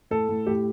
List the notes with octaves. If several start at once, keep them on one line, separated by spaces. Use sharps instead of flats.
A2 A4
A2
A2 G4